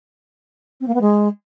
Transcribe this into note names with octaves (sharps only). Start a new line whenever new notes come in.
C4
A#3
B3
G#3